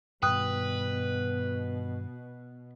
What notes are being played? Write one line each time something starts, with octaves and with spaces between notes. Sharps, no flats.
G2 B2 D#3 B4 G5 D#6 F#6